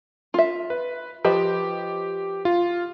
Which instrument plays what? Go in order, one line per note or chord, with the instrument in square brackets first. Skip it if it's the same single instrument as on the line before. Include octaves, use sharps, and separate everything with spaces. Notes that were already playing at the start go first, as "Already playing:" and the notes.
[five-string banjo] F4 E5
[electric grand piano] B4
[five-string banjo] F3 B4 D#5 [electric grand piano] G4
[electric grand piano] F4